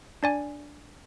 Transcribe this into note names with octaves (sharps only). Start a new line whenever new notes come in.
D4 D5 G#5